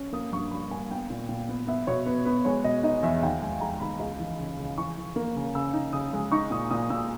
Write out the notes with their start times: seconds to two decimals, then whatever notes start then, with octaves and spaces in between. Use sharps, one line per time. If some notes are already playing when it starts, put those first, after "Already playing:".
Already playing: C#4
0.13 A#3 D#6
0.32 G2 C#6
0.51 G3 B5
0.71 A#3 G#5
0.91 B3 G5
1.10 A#2
1.29 A#2
1.49 B3
1.67 B3 E5
1.87 B2 C#5
2.06 B3 B4
2.25 B3 B4
2.45 G#3 C#5
2.64 B2 D#5
2.83 D#4 D#5
3.03 E2 E5
3.23 D#2 G5
3.42 G#3 G#5
3.61 G#3 A#5
3.80 D#2 B5
4.00 C#2
4.19 E3
4.39 C#3
4.59 C#3
4.77 E3 C#6
4.97 E3
5.16 A#3
5.35 C#3
5.55 C#3 E6
5.73 D#4
5.93 C#3 D#6
6.13 G#3
6.32 D#4 C#6
6.51 A#2 D#6
6.70 A#2 D#6
6.90 A#2 E6